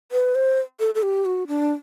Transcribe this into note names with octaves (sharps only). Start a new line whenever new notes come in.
B4
C5
A4
A4
G4
F#4
D4